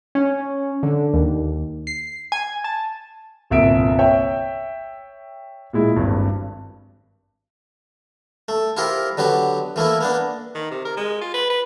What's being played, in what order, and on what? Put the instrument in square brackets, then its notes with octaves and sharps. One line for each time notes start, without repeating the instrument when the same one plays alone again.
[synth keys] C#4
D3
D#2
C7
G#5
A5
[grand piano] G1 C2 A#2 E5 D7
C#5 E5 G5
A#2 G#3 E4
G#1 G2
[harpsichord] A3
E4 F4 G4 A#4 C5
D3 F#3 B3 G4
E3 A3 A#3 E4
A#3 B3 D4
[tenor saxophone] D#3
C3
A#4
G#3
F4
B4
B4